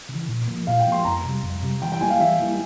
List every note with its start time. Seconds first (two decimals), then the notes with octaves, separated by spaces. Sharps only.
0.09 C#3
0.14 E3
0.29 A#2
0.48 F3 A#3
0.67 A#2 F5
0.80 G5
0.86 F3 A#3
0.92 C6
1.05 F2 A#5
1.25 C3 G3
1.43 F2
1.62 C3 G3
1.82 E3 G5
1.92 G5
2.01 G3 A#3 E4 G#5
2.10 F5
2.20 E3 E5
2.40 G3 A#3 E4